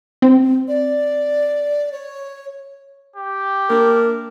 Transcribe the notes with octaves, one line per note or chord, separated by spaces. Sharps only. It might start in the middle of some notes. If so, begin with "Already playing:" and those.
C4
D5
C#5
G4
A#3 D4 A#4